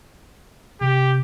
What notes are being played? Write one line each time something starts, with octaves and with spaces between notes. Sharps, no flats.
C3 G4